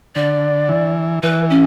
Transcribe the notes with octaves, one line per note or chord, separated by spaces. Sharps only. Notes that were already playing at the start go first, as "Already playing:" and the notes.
D3 D5
E3
E3 B4
C#4